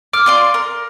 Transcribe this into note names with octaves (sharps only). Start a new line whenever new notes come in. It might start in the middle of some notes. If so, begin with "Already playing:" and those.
D6 F6
F4 D5 C6
A#4